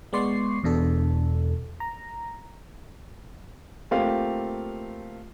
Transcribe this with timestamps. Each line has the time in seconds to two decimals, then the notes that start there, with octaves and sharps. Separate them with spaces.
0.13 G#3 B3 D5 C6 C#6 C7
0.64 E2 B2 D4 A4
1.80 A#5
3.91 A3 A#3 C4 F4 G4 F5